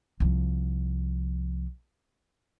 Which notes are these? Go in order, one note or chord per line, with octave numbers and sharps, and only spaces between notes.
C2 F3